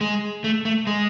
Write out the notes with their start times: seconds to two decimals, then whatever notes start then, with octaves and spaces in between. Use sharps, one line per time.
0.01 G#3
0.44 A3
0.65 A3
0.87 G#3